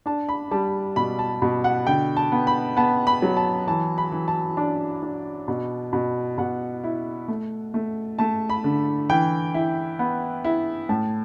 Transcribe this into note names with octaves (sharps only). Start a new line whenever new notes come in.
D4 A5
B5
G3 A5
B2 B5
A5
B2
F#5
D3 G5
A5
B3
B5
B3 A5
B5
F#3
A5
E3 A5
B5
E3
A5
D4 A5
D4
B2
B2
B2 F#5
E4
A3
A3
A3 A5
B5
D3
E3 G5
E4
B3
E4
A2 A5